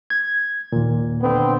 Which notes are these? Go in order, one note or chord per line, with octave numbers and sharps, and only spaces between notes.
G#6
D#2 A#2
D3 B3 C4